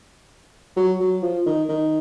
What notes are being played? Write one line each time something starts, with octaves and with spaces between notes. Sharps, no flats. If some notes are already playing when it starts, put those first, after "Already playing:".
F#3
F#3
F3
D#3
D#3